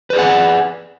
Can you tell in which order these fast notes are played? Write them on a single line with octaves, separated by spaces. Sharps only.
B4 D5 G#4 F#5